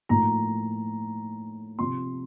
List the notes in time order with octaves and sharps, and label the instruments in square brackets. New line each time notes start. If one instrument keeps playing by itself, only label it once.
[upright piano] A2 F3 A#3 D#4 A#5
C3 F3 C4 C6